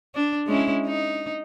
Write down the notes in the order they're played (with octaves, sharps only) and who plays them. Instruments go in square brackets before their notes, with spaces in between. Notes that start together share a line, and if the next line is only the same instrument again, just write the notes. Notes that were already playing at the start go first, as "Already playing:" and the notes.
[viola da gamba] D4
G#3 C#4 E4
D#4